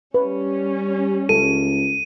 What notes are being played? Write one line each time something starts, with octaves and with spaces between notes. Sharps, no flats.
G3 C#4 B4
C#2 A4 D#7